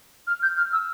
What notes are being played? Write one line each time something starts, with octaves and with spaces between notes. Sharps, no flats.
F6
G6
F6
E6